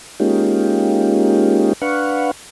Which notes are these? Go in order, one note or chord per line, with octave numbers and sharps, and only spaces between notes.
G#3 A#3 C#4 D#4 F4 G4
D4 B4 F5 F#5 C#6